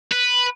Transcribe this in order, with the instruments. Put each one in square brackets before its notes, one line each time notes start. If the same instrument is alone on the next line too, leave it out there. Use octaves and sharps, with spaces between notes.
[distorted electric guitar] B4